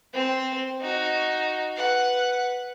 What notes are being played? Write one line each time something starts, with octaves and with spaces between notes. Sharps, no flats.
C4 C5
D#4 F#4
B4 F#5